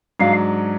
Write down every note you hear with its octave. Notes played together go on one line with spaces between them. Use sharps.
G#2 F#3 D4 F5